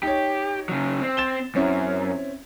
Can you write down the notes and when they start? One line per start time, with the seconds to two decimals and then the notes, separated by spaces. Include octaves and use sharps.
0.03 D#4 G4 C#5
0.69 C#3 F#3
1.01 C4
1.17 A6 E7 G7
1.55 F#2 C4 C#4 E4